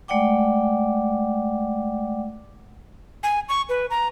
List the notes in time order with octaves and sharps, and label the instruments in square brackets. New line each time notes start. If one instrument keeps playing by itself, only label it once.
[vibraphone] G#3 A3 D5 F#5 G5 D6
[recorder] G#5
C#6
B4
A#5